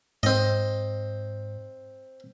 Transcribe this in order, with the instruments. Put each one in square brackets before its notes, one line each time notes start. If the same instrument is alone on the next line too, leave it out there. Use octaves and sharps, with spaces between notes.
[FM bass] G#2 [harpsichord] C4 D#5